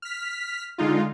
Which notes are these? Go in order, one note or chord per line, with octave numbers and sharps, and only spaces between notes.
F6 B6
D3 G#3 D#4 F4